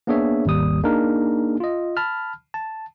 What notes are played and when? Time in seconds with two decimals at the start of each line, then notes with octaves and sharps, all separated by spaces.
0.07 A#3 B3 D4 G#4 C#5 E5
0.46 G#1 D#2 G3 D#6
0.83 A#3 D4 D#4 G#4 A#4
1.60 F4 D#5
1.97 A5 B5 F6
2.54 A5